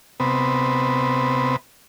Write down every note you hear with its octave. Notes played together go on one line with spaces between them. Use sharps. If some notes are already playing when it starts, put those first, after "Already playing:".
C3 B3